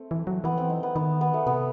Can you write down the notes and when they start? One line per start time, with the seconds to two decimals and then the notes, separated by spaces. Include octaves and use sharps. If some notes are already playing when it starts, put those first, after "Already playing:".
Already playing: A3 C4
0.11 E3
0.27 F#3
0.44 E3 B3
0.58 C4
0.70 D#4
0.83 B3
0.96 D#3 B3
1.21 B3
1.34 A3
1.47 C3 B3